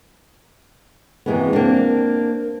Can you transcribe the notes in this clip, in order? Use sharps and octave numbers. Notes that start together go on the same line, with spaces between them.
F#2 C3 E3 G#3 A#3 B3
A#3 C4 D4